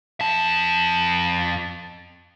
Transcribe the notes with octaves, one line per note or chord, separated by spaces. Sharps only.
F2 A5